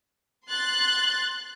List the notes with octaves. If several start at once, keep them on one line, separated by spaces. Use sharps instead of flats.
C6 F#6 A6